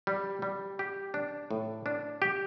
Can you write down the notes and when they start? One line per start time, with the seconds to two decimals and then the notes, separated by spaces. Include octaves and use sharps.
0.07 G3
0.42 G3
0.79 G4
1.14 D4
1.51 A2
1.86 D4
2.22 G4